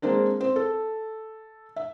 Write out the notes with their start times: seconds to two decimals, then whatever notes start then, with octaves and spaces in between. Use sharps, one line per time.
0.02 G#3 A#3 C4 D4 A#4
0.41 C4
0.56 A4
1.76 E5